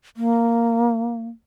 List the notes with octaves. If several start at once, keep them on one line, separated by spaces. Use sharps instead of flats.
A#3